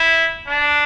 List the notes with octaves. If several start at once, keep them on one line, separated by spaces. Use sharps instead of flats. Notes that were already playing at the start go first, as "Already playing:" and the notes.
Already playing: E4
D4